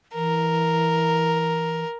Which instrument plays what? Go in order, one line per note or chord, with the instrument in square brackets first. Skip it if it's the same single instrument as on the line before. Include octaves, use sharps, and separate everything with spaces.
[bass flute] E3 [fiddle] A#4